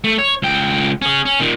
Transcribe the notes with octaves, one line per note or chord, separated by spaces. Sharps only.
A3
C#5
C#2 G5
C#4 G#4
C#4
A#2 D#3